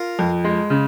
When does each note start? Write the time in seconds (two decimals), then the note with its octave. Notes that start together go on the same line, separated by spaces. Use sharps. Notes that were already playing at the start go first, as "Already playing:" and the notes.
Already playing: F4 A#4
0.19 F2
0.44 G#3
0.70 C#3